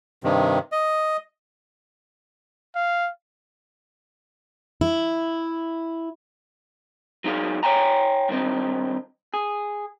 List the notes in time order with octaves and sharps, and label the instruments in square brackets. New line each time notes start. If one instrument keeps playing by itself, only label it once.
[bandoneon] G2 C3 D#3
D#5
[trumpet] F5
[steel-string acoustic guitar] E4
[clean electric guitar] F#3 D#4 G#4 F5
C#5 F5 G5 G#5 A#5
G2 D#3 C4 D#4
G#4